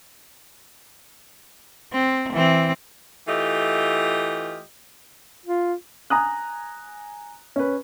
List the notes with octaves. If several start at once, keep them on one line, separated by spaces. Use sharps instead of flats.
C4
E3 C4
E3 A3 F4 G4 D#5
F4
G#5 A#5 D#6 F#6
C#4 B4